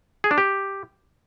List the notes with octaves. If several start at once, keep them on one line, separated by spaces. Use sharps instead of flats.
G#4
D4
G4